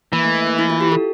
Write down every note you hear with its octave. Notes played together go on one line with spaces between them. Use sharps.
E3 A#3
A3
A3
A#3
E4
F4
G4
A4